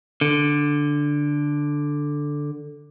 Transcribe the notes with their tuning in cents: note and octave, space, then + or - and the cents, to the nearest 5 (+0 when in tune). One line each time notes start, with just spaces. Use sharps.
D3 +0